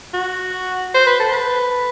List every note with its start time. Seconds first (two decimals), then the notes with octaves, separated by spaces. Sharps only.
0.14 F#4
0.94 C5
1.07 B4
1.20 A4
1.32 B4